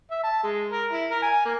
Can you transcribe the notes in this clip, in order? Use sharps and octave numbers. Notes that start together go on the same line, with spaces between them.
E5
A5
G#3
A#4
E4
A#4
G#5
A#3